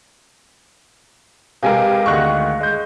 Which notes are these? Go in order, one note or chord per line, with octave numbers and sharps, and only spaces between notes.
C3 G#3 A#4 B4 F5 G5 G#5
D2 D#3 G#3 C#6 F#6 A#6
G#3 G6